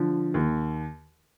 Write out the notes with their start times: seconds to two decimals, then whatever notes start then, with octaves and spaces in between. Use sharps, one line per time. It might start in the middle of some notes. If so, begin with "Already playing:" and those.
Already playing: D3 F3
0.34 D#2